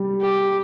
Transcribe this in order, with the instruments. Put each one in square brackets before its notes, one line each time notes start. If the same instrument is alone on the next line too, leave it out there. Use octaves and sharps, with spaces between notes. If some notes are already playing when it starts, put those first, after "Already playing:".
Already playing: [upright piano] G3
[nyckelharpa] G4